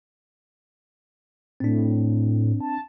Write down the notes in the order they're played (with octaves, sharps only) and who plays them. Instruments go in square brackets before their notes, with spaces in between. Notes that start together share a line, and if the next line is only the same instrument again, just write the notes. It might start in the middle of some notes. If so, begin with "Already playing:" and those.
[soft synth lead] A2 [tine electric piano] C4 D4
[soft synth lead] A5